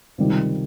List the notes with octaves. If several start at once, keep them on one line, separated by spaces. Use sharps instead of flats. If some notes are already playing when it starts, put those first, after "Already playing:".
C#2 C3 D#3 G3